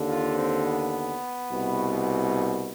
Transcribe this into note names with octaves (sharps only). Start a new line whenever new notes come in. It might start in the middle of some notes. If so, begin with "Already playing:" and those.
Already playing: D#2 D3
F4
C4
B3
C2 B2